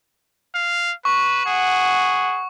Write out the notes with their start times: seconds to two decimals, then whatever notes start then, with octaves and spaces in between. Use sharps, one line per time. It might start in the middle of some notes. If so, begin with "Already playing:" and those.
0.55 F5
1.05 B4 C#6
1.46 G#4 F#5